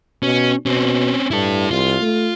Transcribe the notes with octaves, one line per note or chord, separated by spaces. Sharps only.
B2 C#4
B2 C4 C#4
G2 E4 A4
C2 F4
A3